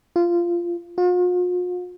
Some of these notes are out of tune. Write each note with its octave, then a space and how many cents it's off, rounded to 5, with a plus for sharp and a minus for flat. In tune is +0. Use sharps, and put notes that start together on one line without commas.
F4 -15
F4 +45